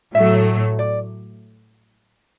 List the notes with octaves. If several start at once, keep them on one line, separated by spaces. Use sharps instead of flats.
A2 F#3 A3 E5
D5